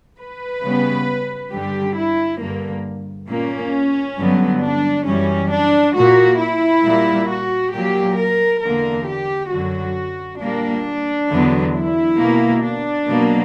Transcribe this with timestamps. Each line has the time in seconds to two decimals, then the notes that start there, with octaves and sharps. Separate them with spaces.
0.18 B4
0.62 C#3 G3 B3
1.51 G2 D3 G3 G4
1.96 E4
2.41 G2 D3 A#3
3.29 A#2 A#3 C#4
4.19 G2 D3 F#3 B3
4.63 D4
5.07 F#2 E3 G3 C#4
5.52 D4
5.96 A#2 A#3 F#4
6.41 E4
6.85 A#2 G3 A#3
7.30 F#4
7.74 A#2 F#3 A#3 G4
8.19 A#4
8.63 E2 D3 A#3 A#4
9.08 G4
9.52 F#2 D3 F#3 F#4
10.41 A#2 G3 A#3 D4
11.30 E2 D3 F#3 B3
11.74 E4
12.19 B2 A#3
12.64 D4
13.08 B2 F#3 A#3